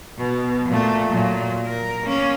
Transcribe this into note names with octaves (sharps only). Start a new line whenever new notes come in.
B2
A#2 A3
A#2 F#3
A#4
A#3 C#4